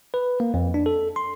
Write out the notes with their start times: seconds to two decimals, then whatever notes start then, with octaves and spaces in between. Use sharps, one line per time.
0.14 B4
0.40 A#3
0.54 F2
0.74 D4
0.86 A4
1.16 C6